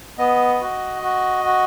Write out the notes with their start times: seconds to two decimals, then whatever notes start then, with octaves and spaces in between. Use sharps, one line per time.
0.18 B3 D#5
0.60 F#4
1.02 F#4
1.44 F#4